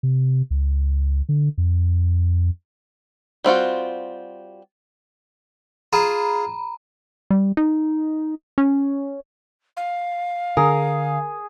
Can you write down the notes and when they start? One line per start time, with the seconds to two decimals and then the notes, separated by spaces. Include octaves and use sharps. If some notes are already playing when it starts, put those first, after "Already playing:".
0.03 C3
0.51 C#2
1.29 D3
1.58 F2
3.44 G3 C4 F4 F#4
5.93 F4 G#4 A#5 B5
7.31 G3
7.57 D#4
8.58 C#4
9.77 F5
10.57 D3 G#4 A#4